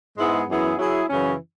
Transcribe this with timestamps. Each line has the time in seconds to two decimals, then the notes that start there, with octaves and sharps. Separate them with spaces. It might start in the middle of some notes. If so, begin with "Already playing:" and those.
0.18 G#2 G#3 B3 E4 G#4
0.49 F#2 E3 B3 E4 G#4
0.78 F#3 E4 G#4
1.09 F#2 C#3 E3 C#4